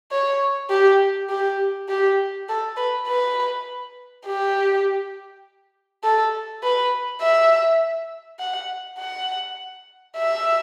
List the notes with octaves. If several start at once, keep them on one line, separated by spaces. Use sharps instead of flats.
C#5
G4
G4
G4
A4
B4
B4
G4
A4
B4
E5
F#5
F#5
E5